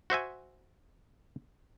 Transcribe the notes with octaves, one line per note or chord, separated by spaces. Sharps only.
F#4 C5 E5 G#5